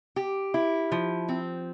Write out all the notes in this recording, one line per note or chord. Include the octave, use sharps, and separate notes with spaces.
G4
E4
F3
C4